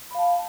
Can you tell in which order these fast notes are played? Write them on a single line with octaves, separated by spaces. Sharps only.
B5 F5 A5